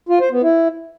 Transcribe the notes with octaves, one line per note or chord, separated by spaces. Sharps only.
F4
C5
B3
E4